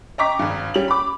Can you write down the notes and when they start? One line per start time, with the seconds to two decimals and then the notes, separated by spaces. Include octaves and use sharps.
0.18 D#5 G5 A#5 C#6 D6 B6
0.39 G#1 G2
0.74 G3 C#4 F7 F#7
0.88 B5 D6